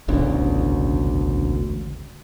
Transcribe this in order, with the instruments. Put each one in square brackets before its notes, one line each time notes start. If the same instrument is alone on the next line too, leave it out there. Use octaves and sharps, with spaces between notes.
[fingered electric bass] E1 A1 D2 C#3